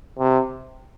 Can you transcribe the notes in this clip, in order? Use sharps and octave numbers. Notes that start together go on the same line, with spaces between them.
C3